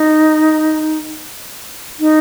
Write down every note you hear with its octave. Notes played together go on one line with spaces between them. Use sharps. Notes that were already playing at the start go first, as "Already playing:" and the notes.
Already playing: D#4
D#4